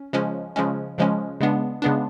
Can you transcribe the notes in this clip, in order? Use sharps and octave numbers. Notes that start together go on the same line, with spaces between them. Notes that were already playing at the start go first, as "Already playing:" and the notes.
Already playing: C#4
C#3 F3 G#3 C#4
C#3 F3 G#3 C#4
C#3 F3 G#3 C#4
C#3 G#3 B3 D4
C#3 G#3 B3 D4